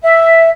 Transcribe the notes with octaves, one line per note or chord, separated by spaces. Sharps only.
E5